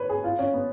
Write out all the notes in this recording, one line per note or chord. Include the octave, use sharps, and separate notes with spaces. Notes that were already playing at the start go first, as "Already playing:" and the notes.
Already playing: B4 C#5
G#4
F4
C#4
B3